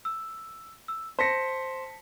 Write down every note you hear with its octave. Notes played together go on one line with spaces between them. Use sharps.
E6
E6
C5 A5 A#6 B6 C#7